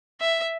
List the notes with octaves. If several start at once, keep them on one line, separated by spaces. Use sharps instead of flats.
E5